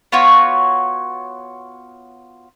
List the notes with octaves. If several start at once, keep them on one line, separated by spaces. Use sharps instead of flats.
B3 F4 F#4 C#5